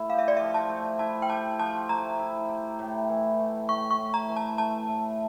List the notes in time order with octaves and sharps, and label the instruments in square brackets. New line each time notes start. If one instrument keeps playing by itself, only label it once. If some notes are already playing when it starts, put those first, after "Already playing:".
Already playing: [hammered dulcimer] A3 E4
[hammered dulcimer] G4 [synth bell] F5
[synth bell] E5
D5
[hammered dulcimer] F3 [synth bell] E5
[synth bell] A5
[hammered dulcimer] A3
[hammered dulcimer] E4 [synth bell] A5
[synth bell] G5
[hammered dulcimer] G4 [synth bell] A5
[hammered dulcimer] F3 [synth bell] A5
[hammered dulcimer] A3 [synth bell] A#5
[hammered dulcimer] E4
G4
A2
E3
A3
[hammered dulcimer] A2 [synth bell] C#6
[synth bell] C#6
[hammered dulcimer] A2
[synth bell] A#5
[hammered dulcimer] E3
[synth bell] A5
[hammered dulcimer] A3 [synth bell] A5
[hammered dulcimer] A2